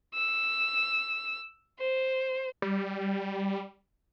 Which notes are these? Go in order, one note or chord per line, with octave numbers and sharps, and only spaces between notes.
E6
C5
G3